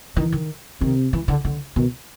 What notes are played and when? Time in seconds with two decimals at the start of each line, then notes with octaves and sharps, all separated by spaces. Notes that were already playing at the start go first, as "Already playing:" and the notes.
0.16 D#3 E3
0.32 D#3
0.81 C3 D#3
1.13 E3
1.28 D3
1.45 D3
1.76 B2 D#3